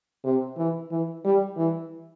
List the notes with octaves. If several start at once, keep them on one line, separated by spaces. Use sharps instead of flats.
C3
E3
E3
G3
E3